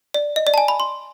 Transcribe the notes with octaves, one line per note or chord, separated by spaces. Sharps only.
D5
D#5
D5
A5
G#5
B5
C6